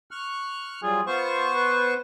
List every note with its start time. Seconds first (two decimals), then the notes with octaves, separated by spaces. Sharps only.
0.11 C#6 F6 F#6
0.83 F#3 G3 F4 G#4
1.07 B3 F4 C5 C#6
1.55 B4